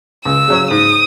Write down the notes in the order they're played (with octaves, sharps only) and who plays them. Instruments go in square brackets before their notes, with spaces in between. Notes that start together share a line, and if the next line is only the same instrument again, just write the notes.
[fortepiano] C#2 [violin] E6
[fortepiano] C#3 F#3 C#4
[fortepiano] G#2 [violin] D#6